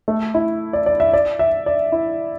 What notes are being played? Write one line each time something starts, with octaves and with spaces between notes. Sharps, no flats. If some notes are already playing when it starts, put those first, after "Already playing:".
A3
E4
D5
D5
E5
D5
E5
D5
E4